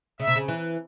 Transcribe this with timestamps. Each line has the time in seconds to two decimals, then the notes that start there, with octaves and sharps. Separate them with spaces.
0.20 C#3 E5
0.27 C3
0.36 C#3
0.48 E3